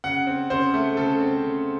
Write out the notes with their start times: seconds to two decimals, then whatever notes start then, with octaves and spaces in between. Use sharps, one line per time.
0.04 C#3 F#5
0.27 C4
0.50 C#3 C5
0.74 A3
0.97 C#3 A4
1.20 C4
1.43 C#3